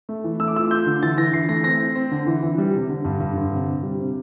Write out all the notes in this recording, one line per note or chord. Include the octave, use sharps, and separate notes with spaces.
A3
E3
A3 E6
D6
F4 E6
F4 G6
D3
E3 A6
E3 A#6
E3 C7
A3 A#6
C4 A#6
C4
C4
D3
E3
E3
G3
C3
D3
G2
G2
D3
C3
C3
G3
C3